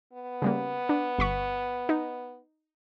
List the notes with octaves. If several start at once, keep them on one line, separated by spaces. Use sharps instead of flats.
B3
C#3 G3 A#3
D4
G1 B5 C#6
D#4